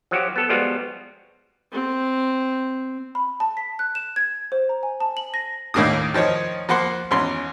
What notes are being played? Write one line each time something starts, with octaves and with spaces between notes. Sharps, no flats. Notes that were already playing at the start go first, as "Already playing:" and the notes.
F3 F#3 F#4 G4
B3 A4
F3 G3 G#3 B3 F4 F#4
C4
B5
A5
B6
F#6
E7
G#6
C5
A#5
G#5
A5
F#7
A#6
D#2 A2 D#3 A#3 D4 D#6
D#3 F3 D#4 C#5
F3 A#3 F#5 C6
G#1 E2 C#4 C6